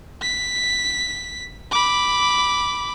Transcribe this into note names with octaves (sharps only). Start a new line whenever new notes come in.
B6
B5 D6